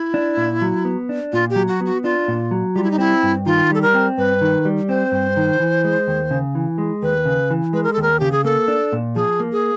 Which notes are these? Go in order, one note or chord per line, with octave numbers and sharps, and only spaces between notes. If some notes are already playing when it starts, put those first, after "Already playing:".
Already playing: E4
D4
A#2
F#3
B3
D4
A#2 F4
G4
F#3
F#4
B3 F#4
D4 F4
A#2
F#3
G3 F4
E4
D#4
C4 E4
G2
D#3 F4
G3 A4
A#4
C4
G2 B4
D#3
G3
C4 C5
G2
D#3
E3
G#3
D#2
C#3
E3
G#3
D#2 B4
C#3
E3
G#3 B4
A#4
A4
D#2 A#4
C#3 G4
G#4
A#3 A4
D4
A#2
F3 G#4
A#3
G#4